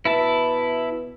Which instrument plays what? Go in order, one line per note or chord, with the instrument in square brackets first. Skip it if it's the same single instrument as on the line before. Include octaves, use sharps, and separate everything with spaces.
[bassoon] B2 [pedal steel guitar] E4 E5 A5